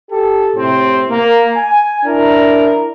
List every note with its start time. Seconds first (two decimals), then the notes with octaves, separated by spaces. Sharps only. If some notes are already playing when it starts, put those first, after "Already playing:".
0.10 G4 A4
0.55 A2 C3 C4
1.10 A#3
1.53 G#5
2.04 D4 E4 A#4